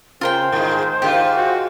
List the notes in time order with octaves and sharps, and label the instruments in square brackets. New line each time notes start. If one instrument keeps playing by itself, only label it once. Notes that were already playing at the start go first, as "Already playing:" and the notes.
[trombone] C#3 [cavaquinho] F4 A#4 G5 [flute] C5
[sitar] G#2 G#3 [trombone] D#3
[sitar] G#2 F#3 F4 [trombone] D#3 [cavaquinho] G4
[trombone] F#4